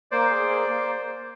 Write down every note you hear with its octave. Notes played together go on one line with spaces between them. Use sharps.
A#3 C5 D5
G#4
A#3
A#3